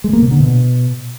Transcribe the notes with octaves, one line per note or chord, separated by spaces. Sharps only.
G#3
A#3
C3
D3
B2